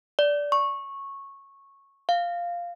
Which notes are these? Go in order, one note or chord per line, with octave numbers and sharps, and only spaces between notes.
D5
C#6
F5